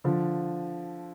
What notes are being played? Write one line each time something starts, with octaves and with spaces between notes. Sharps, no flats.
D3 F3